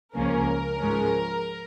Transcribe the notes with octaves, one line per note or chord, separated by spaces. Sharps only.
C#2 C#3 F3 A#3 C#4 A#4
G#2 F3 G#3 C#4